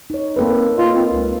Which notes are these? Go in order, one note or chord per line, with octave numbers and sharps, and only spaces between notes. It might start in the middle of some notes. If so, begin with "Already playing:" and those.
D#4 C#5
A#3 C4 A4 B4
F4 B4 D#5
C4
C#2